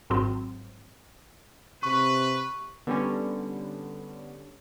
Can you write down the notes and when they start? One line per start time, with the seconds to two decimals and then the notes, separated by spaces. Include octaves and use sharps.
0.10 G#1 G#2 F#3 C4
1.83 C3 B4 C#6
2.87 D3 G3 B3 C#4